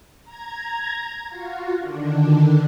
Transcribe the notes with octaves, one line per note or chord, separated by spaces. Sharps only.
A#5 G#6
F4 F#4
D3 D#3 D4